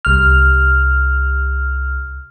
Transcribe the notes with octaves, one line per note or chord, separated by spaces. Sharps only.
C2 F6